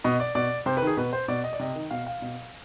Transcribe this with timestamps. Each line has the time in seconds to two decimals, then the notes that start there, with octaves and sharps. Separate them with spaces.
0.04 B2 D#5
0.20 D5
0.35 B2 D5
0.66 C3 C5
0.77 B4
0.82 D#3 G#4
0.97 B2 B4
1.13 C5
1.28 B2 D5
1.44 D#5
1.53 D5
1.59 C3 D#5
1.75 D#3
1.91 B2 F5
2.07 F5
2.22 B2